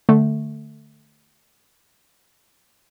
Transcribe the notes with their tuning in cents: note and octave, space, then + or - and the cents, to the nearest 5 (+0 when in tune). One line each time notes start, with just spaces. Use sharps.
D3 +15 A3 +0